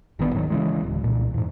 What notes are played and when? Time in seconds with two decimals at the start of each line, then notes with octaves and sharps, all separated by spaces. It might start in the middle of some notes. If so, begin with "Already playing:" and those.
0.19 G1 D#3 B3 D4
0.33 D#2 G#2 D#3 F#3
0.50 C#3 E3 G#3
0.83 D1
1.04 C2 A#2
1.34 E2 G#2